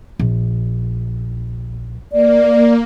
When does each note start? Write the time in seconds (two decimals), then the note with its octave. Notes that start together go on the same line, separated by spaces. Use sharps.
0.19 A#1
2.13 A#3 D5